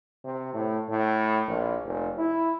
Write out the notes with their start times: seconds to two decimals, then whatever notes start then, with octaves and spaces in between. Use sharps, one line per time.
0.24 C3
0.54 A2
0.89 A2
1.48 A#1
1.85 F1
2.18 E4